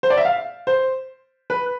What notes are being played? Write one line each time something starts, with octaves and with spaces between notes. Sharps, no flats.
C5
D5
E5
F5
C5
B4